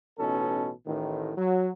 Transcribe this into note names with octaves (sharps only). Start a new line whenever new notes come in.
A1 B2 C#4 D#4 A4
A1 A2 D#3
F#3